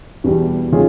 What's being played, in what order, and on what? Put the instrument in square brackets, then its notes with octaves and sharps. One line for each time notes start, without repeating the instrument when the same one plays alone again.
[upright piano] E2 B2 G3
D#3 G#3 C#4 F4 G#4